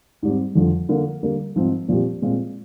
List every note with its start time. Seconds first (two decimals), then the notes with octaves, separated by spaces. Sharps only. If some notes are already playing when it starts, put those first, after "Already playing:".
0.23 G#2 G3 C4
0.55 F2 D3 F3
0.89 D3 F3 A#3
1.23 D3 G3 A#3
1.56 G#2 F3 C4 D#4
1.89 A#2 F3 C4 G4
2.22 A#2 G#3 C4 F4